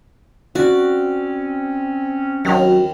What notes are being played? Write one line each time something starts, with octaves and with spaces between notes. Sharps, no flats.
C4 C#4 F#4 D5
D#2 D#3 F#3